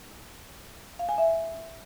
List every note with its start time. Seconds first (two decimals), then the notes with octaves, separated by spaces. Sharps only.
0.99 F5
1.09 G#5
1.18 E5